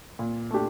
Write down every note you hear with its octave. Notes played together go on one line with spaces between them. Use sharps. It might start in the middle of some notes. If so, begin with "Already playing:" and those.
A#2
A3 D4 G4